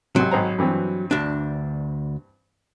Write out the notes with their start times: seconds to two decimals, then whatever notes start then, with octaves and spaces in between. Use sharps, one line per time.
0.16 G#1 C3 F#3
0.31 G#1 C5 A#5
0.58 G2 E3 C4
1.11 D2 D4